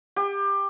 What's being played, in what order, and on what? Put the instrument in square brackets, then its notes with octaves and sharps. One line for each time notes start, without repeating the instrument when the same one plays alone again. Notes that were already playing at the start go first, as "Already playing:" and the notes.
[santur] G4